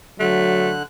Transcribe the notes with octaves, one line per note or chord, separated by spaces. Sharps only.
D3 F#3 A3 F#6